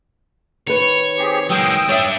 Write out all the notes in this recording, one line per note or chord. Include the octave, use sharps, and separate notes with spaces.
D#3 B4 C#5
C4 G4 G#4
D#3 F#3 G#3 G5 D#6 E6
G3 D4 C#5 E5